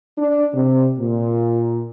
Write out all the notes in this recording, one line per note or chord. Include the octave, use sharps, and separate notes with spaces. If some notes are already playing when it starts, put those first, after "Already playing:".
D4
C3
A#2